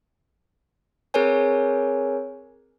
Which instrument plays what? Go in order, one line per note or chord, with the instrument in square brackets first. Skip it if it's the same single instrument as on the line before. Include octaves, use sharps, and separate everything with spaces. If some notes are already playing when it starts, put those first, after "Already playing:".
[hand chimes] C4 G#4 A#4 B4 C#5 G#5